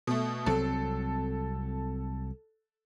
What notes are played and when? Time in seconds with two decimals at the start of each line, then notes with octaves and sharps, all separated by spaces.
0.07 B2 A3
0.46 C2 F#3 C4 A4